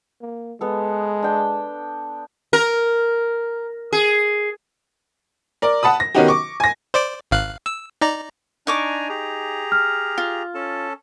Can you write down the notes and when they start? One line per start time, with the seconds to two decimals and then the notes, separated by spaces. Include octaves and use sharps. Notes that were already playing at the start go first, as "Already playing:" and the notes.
0.22 A#3
0.61 G#3 B3 A4
1.23 D4 G5 A5
2.53 A#4
3.93 G#4
5.62 A#4 D5
5.83 F#5 A5 B5 D#6
6.00 A#6
6.15 D#3 B3 C#4 D#4 F#4 G4
6.28 C#6 D6
6.60 G#5 A#6
6.94 C5 D5 D6
7.31 G#1 F5 F#6
7.66 E6
8.01 D#4 D5 A#5
8.67 D4 D#4 G#5 A#5 C#6 D6
9.09 G4 G#4 A#5
9.72 F6
10.18 F4
10.55 C#4 A4 A5